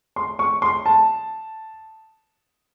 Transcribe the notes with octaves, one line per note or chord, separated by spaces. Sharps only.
C6
C#6
C6
A5